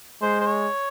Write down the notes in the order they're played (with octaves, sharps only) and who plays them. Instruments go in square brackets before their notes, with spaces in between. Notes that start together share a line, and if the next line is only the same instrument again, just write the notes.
[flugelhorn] G#3 [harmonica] C5
[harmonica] C5
C#5